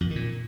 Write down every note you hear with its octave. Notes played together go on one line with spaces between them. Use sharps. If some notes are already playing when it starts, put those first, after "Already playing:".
F2
A#2
D#3
A#2